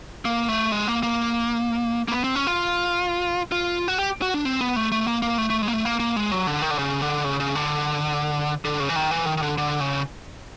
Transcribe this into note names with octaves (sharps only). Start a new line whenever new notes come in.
A#3
A3
G#3
A#3
A#3
A#3
B3
C4
C#4
F4
F4
F#4
G4
F#4
D4
C4
B3
A3
A3
A#3
A#3
A3
A3
G#3
A#3
A3
A#3
A#3
G#3
F#3
D3
D#3
D3
C#3
D3
C#3
C#3
D3
D3
C#3
E3
D#3
E3
D#3
D#3
D3
D3
C#3